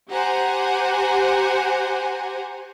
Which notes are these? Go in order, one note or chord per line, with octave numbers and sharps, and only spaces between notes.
G4 C5 F#5 G#5 A#5